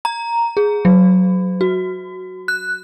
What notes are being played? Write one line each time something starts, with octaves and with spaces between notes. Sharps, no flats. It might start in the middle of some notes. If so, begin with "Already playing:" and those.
A#5
G#4
F#3
F#4
F#6